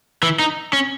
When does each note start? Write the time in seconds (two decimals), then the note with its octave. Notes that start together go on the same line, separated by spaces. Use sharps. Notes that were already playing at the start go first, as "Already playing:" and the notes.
0.23 E3
0.39 D#4
0.73 C#4